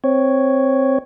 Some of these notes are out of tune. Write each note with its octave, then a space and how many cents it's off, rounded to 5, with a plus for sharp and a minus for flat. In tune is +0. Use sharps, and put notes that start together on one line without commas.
C4 +0 C#5 +0